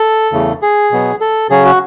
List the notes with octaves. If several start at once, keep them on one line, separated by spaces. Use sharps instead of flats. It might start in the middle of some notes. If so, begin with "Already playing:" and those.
Already playing: A4
E2 C#3 E3 A3
G#4
B2 F#3 B3
A4
C#3 F#3 C#4 G#4
F#4